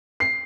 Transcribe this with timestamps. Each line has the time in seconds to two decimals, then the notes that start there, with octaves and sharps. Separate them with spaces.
0.20 C7